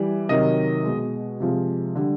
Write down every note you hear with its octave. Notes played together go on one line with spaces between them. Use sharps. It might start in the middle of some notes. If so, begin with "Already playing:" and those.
Already playing: E3 G3
C3 D#3 F#3 D#5
B2 G#3
C3 F3 G#3
D3 G3